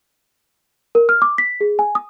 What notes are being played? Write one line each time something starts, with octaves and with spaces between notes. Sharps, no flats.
A#4
F6
D6
B6
G#4
G#5
D#6